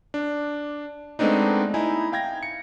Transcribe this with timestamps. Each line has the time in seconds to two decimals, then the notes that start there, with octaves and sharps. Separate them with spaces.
0.14 D4
1.19 G#3 A3 B3 C4 D4 D#4
1.74 D#4 E4 G#5
2.12 F5 G5 G#6 A#6
2.43 C#7